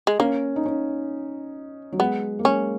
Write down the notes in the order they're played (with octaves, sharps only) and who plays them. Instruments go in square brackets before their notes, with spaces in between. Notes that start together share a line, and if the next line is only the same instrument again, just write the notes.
[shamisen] G#3
[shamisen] A#3 [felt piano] C#4
[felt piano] D#4
C#4
F#3
[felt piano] G#3 [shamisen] B3
[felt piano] A#3
[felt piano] G#3 [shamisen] C#4